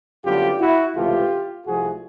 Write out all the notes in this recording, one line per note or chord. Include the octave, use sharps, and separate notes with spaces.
F#2 D3 G3 B3 F4 G4
E4 F#4
C#2 C3 E3 A3 F4 G4
C2 C3 F3 A3 F#4 G#4